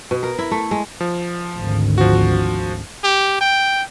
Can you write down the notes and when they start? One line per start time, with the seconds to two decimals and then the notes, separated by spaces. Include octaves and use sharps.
0.11 B2
0.23 A#4
0.39 E4
0.51 A3
0.71 G#3
1.01 F3
1.55 G#1 D2
1.98 F3 F#4
3.04 G4
3.41 G5